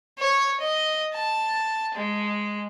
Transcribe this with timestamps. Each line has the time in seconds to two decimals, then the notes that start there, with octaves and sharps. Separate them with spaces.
0.18 C#5
0.60 D#5
1.14 A5
1.95 G#3